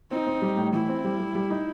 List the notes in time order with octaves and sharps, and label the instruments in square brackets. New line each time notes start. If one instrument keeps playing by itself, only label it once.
[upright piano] C4 [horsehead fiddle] D#4
[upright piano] C4
G3
A2
[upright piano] E3 [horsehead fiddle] E4
[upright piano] C4
G3
G3
G3
D#4